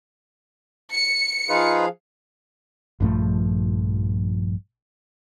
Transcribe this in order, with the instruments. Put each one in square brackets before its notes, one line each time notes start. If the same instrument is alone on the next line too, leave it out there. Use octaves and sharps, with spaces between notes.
[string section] C#7
[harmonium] F3 G#4 F5 [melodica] D#4 F4 B4
[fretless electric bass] A#1 G2 F3 A3